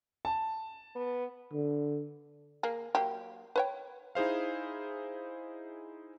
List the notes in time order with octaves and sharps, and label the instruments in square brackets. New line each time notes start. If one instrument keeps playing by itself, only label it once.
[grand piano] A5
[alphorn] B3
[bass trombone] D3
[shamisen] A#3 G#4
F#3 A#3 G4
B4 C#5 G5
[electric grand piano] D#4 E4 G#4 C5 F5